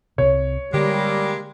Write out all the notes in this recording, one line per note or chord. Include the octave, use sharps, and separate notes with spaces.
C2 C3 C#5
D3 G3 G#3 A#3 G4